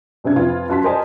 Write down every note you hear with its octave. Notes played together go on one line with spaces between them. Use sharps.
F#2 C3 D4 G#6
F2 F4 B4
F#2 F#4 A5 C6 B6
A#4 C5 D5 D#5 G#5 A5